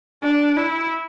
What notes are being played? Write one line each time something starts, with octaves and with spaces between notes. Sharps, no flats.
D4
E4